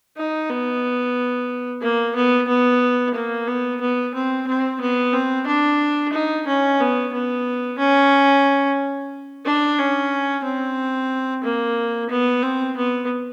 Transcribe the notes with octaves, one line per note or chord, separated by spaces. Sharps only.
D#4
B3
A#3
B3
B3
A#3
B3
B3
C4
C4
B3
C4
D4
D#4
C#4
B3
B3
C#4
D4
C#4
C4
A#3
B3
C4
B3